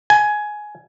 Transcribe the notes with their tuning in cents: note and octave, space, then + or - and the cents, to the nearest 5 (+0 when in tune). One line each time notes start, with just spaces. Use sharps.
G#5 +15